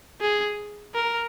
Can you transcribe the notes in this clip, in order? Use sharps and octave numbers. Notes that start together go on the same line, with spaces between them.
G#4
A#4